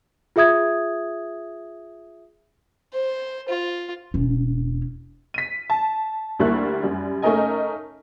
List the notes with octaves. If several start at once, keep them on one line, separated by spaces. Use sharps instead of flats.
F4 G#4 E5 D#6 G#6
C5
F4
E1 C#4
B6 D#7
A5
D2 G3 A#3 E4 C#6 F#6
F#2 G3
A3 C#4 D#4 A#4 D#5 G#5